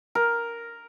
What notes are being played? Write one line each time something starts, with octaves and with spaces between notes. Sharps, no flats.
A#4